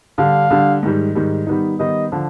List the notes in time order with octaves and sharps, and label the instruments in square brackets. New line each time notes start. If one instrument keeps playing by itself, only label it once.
[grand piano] D3 G3 D4 [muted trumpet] F5
[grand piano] D3 G3 D4
G#2 D#3 G3
G#2 D#3 G3
D#3 G3 B3 D#4
[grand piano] D#3 G3 B3 D#4 [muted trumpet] D#5
[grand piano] D3 F3